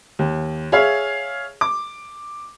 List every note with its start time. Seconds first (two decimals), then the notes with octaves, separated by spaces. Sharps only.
0.19 D#2
0.72 G#4 C#5 E5 F5
1.61 D6